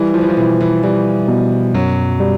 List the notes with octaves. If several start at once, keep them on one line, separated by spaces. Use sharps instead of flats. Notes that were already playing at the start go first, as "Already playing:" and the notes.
Already playing: E3 G3
F3
E3
F3
B2 E3
E3
E3 G3
B2
F#2 F#3
G3